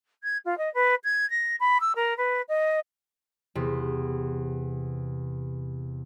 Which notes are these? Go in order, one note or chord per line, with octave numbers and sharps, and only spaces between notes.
G#6
F4
D#5
B4
G#6
A#6
B5
E6
A#4
B4
D#5
E2 C3